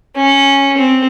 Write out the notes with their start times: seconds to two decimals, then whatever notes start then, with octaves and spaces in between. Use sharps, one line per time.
0.16 C#4
0.77 C4